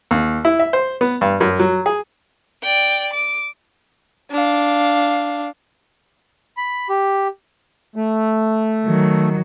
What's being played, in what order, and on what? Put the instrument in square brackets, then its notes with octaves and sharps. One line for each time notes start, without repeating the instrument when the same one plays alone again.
[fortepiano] D#2
E4
E5
C5
B3
G2
F#2
F#3
G#4
[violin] D5 G5
D6
[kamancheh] D4 F5
[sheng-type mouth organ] B5
G4
[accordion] A3
[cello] D#3 F#3